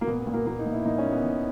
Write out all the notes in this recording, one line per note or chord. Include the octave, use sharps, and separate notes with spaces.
A#3
A#2 B3
B3
A#2
A#3
A#2 A#3
D#4
A#2
E4
A#2 D#4
C#4
A#2
B3
A#2